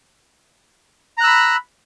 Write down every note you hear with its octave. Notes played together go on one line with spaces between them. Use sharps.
A#5 B5 E6 F#6